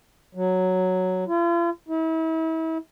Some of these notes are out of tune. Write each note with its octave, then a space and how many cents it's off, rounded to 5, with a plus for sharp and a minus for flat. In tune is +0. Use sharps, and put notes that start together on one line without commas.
F#3 +0
F4 -40
E4 -35